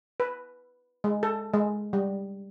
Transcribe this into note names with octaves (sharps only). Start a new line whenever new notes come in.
B4
G#3
A4
G#3
G3